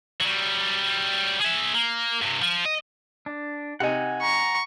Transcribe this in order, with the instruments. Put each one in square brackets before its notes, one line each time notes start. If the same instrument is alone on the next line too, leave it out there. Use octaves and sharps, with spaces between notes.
[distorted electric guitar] F#3 G3
G#4 E5
A#3
G2 C3
F3
D#5
[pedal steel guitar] D4
[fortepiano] C3 D#4 [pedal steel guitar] F#5 G#5
[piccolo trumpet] A#5 [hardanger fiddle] C#6